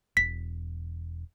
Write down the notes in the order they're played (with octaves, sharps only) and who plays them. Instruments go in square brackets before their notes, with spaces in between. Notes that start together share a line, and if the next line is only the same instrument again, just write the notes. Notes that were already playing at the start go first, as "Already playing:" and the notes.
[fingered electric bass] E1 [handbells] B6